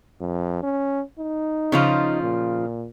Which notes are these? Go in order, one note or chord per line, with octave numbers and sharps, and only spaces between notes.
F2
C#4
D#4
C#3 F3 F4
A#2